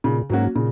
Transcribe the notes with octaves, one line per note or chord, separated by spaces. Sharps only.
A#2 C#3
G#2 F#3 A#3 C#4 F#4
A#2 C#3